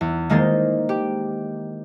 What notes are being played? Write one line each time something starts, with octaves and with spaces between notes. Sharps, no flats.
E2
D#3 G#3 A#3 D#4 C5 A6
G4